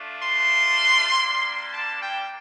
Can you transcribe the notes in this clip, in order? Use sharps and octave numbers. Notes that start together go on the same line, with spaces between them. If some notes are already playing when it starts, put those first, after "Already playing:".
Already playing: A3 D4 F4
C6
G3 A#3 D4
A5
G5